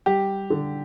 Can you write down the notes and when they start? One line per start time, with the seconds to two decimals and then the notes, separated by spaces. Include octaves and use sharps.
0.06 G3 G4
0.50 D3